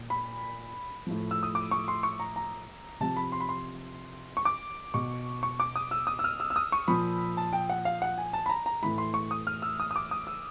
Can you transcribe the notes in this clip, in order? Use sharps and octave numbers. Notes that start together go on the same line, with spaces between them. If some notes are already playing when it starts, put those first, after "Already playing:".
Already playing: A#2
B5
A2 F3
E6
D#6
D6
C#6
C6
C#6
A#5
A#5
C3 F3 A5
B5
C6
B5
C6
C#6
D6
B2 C#6
C#6
D6
D#6
E6
D#6
E6
F6
E6
E6
D#6
C#6
A#2 F3 B5
A5
G5
F#5
F5
F#5
G#5
A5
B5
A#5
A#5
A2 E3 B5
C6
C#6
D#6
F6
E6
D#6
D#6
D6
D#6
E6